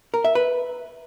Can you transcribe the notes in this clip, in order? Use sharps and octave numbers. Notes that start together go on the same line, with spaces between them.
A#4
E5
B4